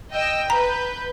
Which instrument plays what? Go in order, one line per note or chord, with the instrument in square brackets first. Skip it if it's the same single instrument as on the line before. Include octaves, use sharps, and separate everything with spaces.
[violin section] D#5 G5 E6
[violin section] B4 G6 [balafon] A#5